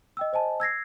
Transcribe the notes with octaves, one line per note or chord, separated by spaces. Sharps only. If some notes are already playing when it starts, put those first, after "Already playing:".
D#5 G5 E6
C5 D#5 G#5 A5
E6 G#6 A#6 C7